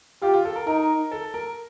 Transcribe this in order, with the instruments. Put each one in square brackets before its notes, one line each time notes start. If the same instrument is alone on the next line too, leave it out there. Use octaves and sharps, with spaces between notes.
[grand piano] F4 [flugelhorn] G4
[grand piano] F4
A4
A#4
[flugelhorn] D#4 [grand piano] A#4
[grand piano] A4
A#4